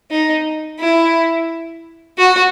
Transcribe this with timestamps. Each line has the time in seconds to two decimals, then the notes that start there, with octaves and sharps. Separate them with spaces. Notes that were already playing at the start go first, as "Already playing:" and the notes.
0.11 D#4
0.79 E4
2.18 F#4